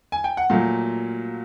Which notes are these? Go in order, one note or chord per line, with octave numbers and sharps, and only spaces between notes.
G#5
G5
F#5
A#2 F#3 A3 F5